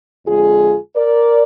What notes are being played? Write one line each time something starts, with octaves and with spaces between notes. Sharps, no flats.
F2 D3 G#3 F4 G#4
A#4 D5